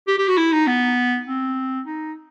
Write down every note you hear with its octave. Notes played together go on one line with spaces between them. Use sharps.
G4
G4
F#4
E4
D#4
B3
C4
D#4